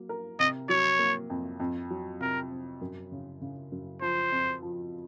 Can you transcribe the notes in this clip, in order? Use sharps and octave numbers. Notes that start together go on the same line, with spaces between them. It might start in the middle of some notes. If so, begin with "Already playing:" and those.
Already playing: F#3 A#3
A#4
C3 D#5
F#3 C#5
A#3
F2
F2
F#3
C3 A#4
C4
F#2
C#3
C#3
F#2
F3 C5
F2
F3